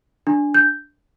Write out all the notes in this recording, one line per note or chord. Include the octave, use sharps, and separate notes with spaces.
D4
G6